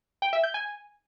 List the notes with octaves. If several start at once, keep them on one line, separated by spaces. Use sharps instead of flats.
G5
E5
G6
G#5